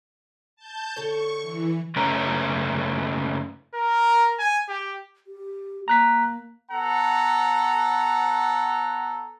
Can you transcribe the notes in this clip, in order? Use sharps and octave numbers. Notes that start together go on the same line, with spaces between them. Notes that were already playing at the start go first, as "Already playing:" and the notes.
A5 G6
D3 A4 C#5 C#6
E3
F#2 C#3 A3 C#4 B4 A#5
A#4
G#5
G4
G4
A#3 A#5 F#6 B6
B3 A4 F#5 A#5